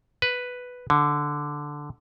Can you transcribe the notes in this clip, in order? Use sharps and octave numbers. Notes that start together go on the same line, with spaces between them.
B4
D3